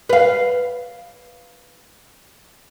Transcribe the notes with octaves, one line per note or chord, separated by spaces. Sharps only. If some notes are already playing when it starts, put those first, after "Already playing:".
B4 F5